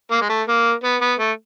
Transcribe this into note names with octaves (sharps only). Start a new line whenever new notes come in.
A#3
G#3
A3
A#3
B3
B3
A3